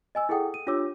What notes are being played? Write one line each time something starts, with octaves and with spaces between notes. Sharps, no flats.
D#5 G#5 E6
E4 G#4 A4 F#5 G5 D#6
D#7
D4 F4 G4 C#5 D6 E6